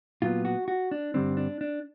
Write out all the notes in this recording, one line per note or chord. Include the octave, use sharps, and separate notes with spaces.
A#2 F#3 B3 F4
F#4
F#4
D4
G2 D3 G3 C4 D4
D4
D4